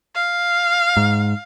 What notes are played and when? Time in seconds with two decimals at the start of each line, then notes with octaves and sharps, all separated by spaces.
0.15 F5
0.97 G#2